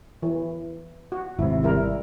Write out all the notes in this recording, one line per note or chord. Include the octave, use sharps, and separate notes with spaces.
E3
F#4
G#1 C3 E4
G3 E4 A#4